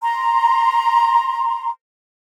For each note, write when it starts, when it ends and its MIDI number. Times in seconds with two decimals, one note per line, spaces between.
0.03 1.69 82
0.03 1.69 84